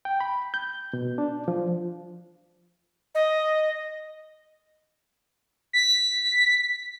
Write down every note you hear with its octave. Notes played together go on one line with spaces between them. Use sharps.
G5
B5
G6
B2
D4
F3
D#5
B6